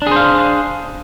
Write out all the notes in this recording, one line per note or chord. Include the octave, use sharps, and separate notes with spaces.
D4 G#4 C5 F5